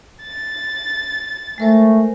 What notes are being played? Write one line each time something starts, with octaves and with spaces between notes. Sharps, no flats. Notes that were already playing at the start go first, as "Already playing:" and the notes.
A6
G#3 A3 A#4 C5